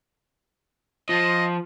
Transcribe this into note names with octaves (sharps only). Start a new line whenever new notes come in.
F3 D#5